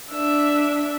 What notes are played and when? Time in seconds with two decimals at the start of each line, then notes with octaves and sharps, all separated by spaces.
0.12 D4 E5